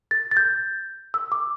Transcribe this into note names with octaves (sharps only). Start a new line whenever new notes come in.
A6
A6
G6
E6
D6